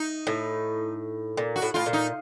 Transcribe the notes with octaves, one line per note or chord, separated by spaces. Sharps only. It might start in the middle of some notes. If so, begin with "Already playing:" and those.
Already playing: D#4
A2
A#2
F#4
A2
A2 F4
A#2
D#4